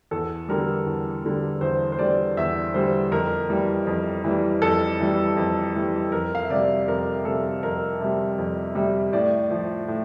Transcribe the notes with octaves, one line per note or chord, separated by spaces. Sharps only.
E2 A4
D3 G3 A#4
E2
D3 G3
E2 C5
C5
D3 G3 D5
E2 E5
D3 G3 C5
F2 A#4
E3 G3
F2
E3 G3
F2 A4
E3 G3
F2
E3 G3
F2 A#4
F5
E5
C3 G3 D5
F2 A#4
C3 G3 A4
F2 A#4
C3 G3
F2
C3 G3
A2 D5
F3
A2